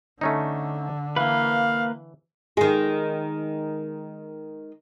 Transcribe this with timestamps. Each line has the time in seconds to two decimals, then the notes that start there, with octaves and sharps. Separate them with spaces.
0.21 D3 A3 C#4 D#4
1.16 E3 A#3 B4 F5
2.57 D#3 G#3